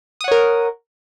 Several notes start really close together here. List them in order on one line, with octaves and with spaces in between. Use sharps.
D#6 F#5 C#5 A#4